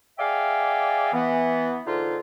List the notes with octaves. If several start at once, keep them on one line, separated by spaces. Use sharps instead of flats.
G#4 D5 E5 F5 G5 G#5
E3 B3
G#2 D3 D#4 F4